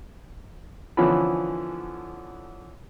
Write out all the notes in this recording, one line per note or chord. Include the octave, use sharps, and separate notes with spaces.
D3 E3 F3 B3 C#4 B5